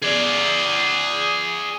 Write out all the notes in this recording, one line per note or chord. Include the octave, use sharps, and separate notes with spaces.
G#4 D5